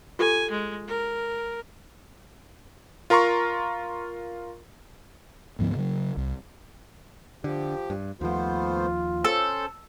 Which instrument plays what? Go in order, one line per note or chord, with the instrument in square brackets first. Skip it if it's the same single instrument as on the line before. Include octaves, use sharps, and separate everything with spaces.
[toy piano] F4 G4 A4 [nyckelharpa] G#5
[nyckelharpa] G#3
A#4
[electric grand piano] F4 A#4 A#5 C6 C#6
[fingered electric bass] D2 G#2 F3 B3
C#3 F#3
C2
[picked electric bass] D3 [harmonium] F3 G4
[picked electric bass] G2
[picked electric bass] D#2 F3 [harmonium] A3 B3 C5 [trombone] F4
[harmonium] C#4 C5 [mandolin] A4